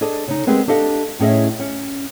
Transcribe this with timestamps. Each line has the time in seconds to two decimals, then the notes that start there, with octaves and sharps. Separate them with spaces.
0.01 D4 G#4 A4 D#5
0.28 C#3 D#4
0.47 G#3 B3 C4 G4 G#4 A#4
0.68 D4 G4 A4 D#5 F5
1.19 A2 C#4 G#4 D#5 E5
1.59 C#4